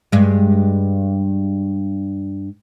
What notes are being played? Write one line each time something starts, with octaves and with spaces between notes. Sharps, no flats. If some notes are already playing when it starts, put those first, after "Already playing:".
G2 G#3